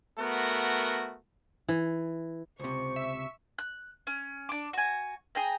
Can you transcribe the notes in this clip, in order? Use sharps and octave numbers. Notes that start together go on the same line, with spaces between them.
A3 B3 F#4 A#4
E3
C#2 C3 C5 C#6
E5
F#6
C#4
D4 D6
F#4 G#5
G#4 G5 A#5